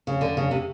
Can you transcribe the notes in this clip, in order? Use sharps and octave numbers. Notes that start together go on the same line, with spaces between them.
C#3
D3
C#3
C3